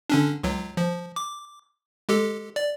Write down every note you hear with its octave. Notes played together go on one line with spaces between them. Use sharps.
D3 C#4 D4
C#2 F#3
F3
D6
G#3 G4 A4
D5